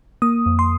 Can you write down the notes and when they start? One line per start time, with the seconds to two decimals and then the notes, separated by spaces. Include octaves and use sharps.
0.22 A#3 D#6
0.46 F2
0.59 C6